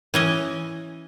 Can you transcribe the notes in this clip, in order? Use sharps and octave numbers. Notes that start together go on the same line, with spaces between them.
E3 C#4 D#5